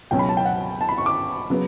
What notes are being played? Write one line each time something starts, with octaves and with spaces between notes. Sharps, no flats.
C#2 B2 F#3 C#4 G5
B5
A5
G5
F#5
A5
B5
C#6
D6
C#3 F#3 B3